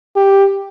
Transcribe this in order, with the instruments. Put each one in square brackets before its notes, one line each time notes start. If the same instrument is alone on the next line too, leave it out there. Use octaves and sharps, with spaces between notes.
[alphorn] G4